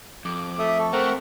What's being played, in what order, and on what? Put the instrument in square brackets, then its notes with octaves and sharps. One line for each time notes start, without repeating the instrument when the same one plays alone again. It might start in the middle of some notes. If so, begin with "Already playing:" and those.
[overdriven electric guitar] F2 [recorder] D6
[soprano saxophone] A3 [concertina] E5 D#6
[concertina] A4 [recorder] C#6
[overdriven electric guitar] A3 [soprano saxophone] C4 [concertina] A#4 F#5 A#5